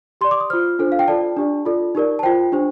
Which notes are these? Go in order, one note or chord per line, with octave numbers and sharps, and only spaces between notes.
G4 D5 C6
D6
D#6
F4 C5 F6
D4 F4 A4 C5
F5
G5
F4 A4 D5 A5
D4 G4 D5
F4 A4 D5
D#4 G4 A#4 D5
A5
F4 C5 G5
D4 G4 C5